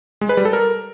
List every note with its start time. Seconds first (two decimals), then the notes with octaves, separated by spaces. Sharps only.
0.21 G#3
0.29 B4
0.37 G3
0.45 A4
0.53 A#4